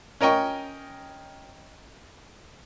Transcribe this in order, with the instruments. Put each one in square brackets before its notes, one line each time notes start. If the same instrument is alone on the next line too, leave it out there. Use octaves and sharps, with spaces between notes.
[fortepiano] C#4 A#4 D#5 G5 C#6